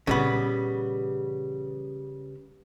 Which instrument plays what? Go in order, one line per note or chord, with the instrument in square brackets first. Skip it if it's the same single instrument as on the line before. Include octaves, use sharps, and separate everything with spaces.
[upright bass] A#2 E3 [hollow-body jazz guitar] C#3 G3 B3